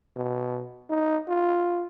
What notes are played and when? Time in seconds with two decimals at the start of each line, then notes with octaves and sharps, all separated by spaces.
0.16 B2
0.90 D#4
1.28 F4